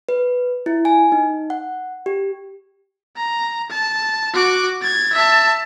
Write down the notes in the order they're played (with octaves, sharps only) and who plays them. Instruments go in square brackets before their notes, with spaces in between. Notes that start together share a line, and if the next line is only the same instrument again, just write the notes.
[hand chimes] B4
E4
G#5
D#4
F#5
G4
[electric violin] A#5
A5
F#4 D6
G#6 A6
E5 A5